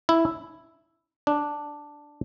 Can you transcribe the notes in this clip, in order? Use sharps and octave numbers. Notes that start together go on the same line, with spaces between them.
E4
D4